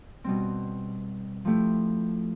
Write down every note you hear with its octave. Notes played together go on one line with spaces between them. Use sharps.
B2 G3 C4
F3 A3 E4 G4